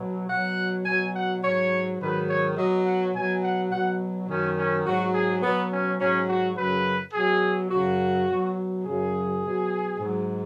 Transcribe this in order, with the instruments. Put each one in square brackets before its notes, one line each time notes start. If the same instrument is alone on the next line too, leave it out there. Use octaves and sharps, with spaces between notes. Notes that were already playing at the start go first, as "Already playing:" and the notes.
Already playing: [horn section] B2 F#3
B2 F#3 F#5
B2 F#3 G#5
F#5
G#2 F#3 C#5
G#2 D#3 F#3 B4
C#5
B2 F#3 D#5
F#5
B2 F#3 G#5
F#5
B2 F#3 F#5
F#2 D#3 F#3 C#4
C#4
G#2 F#3 F#4
G#4
B2 F#3 B3
C#4
G#2 F#3 C#4
F#4
F#2 C#3 F#3 B4
B2 F#3 G#4
F#2 C#3 F#3 F#4
B2 F#3
F#2 C#3 F#3 G#4
B2 F#3
G#2 F#3